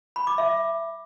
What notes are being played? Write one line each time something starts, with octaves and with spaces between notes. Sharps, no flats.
B5
D6
E5